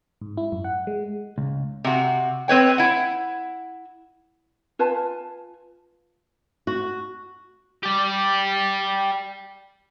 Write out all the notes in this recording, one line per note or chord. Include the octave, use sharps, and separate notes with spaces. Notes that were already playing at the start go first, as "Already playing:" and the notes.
G#2
E4
F#2
F#5
G#3
C#2
C3 F#4
C4 B4 C#5 G5
E4 F#5
F4 B4 G#5 A5
F#4
G4 D5